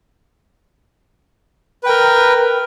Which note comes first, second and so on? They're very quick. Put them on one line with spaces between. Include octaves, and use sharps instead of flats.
B4 G5 A#4